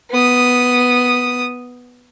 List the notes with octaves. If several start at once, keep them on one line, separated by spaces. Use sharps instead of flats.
B3 D#6